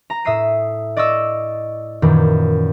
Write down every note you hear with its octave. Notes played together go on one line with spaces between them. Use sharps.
A#5
A2 E5 D#6 C7 D#7
D5 D#5 C#6 D#6 E6
F#2 A#2 D#3 E3